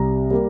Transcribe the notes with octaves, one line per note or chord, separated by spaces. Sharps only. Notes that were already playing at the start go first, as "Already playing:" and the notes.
Already playing: C2 C3 G3 A#5
G3 A#3